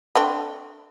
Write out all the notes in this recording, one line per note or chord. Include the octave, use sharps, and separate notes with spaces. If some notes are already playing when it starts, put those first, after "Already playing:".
A3 C4 D4